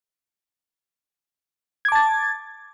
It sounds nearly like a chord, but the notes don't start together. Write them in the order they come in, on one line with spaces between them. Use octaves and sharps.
G#6 D6 A5 A6